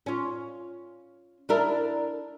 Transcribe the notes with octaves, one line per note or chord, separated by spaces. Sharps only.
C#4 F4
D4 E4 A#4